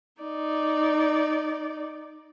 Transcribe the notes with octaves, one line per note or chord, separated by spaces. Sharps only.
D#4 D5